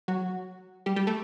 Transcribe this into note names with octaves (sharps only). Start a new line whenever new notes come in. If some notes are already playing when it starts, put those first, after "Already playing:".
F#3 F#4
G3 G4
G3 G4
A3 A4